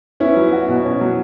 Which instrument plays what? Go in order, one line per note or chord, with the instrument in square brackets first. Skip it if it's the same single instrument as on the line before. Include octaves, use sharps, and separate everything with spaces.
[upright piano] B3 E4 [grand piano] C#4
[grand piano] F#3
F#4
B2
C#4
F#3